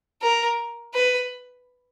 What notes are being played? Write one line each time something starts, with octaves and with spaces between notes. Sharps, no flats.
A#4
B4